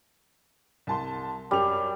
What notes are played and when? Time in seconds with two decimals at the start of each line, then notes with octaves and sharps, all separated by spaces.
0.87 C2 A5 C6
1.51 F#2 G3 F7